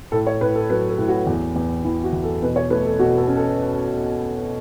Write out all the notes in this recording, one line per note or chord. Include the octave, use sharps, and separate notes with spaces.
A2 A4
C#5
A2 B4
A4
F#3 B4
A4
A2
F#4
E2
E2
E3 E4
F#4
E2
A4
B2 B4
C#5
A3 B4
A4
B2 F#4
A4
C#4
A4